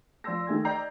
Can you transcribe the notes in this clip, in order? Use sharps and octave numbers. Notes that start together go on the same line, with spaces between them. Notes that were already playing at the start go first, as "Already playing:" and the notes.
F3 D5 C6 E6 A#6
D#3 A3 G#4 G#6
D5 D#5 G5 A#5 G6 C7